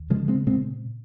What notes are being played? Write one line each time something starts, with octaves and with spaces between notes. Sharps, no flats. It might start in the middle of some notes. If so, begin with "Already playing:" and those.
Already playing: D#2
C#3 F3 G#3
G#3 C4
A#2 G#3 C4